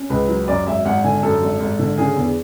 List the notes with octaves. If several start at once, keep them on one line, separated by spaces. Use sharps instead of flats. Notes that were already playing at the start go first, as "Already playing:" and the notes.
Already playing: C#4
C#2 B4
F#3
F#2 D5
G#1 E5
G#1 F#5
D3 G#5
F#2 A4
G#1
G#1
D3
C#3 G#4
E2